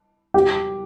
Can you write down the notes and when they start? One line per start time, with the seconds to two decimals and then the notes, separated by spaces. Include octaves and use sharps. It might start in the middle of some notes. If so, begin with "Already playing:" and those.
0.34 G4